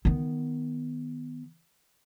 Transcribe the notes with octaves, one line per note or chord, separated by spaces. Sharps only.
D#3 B3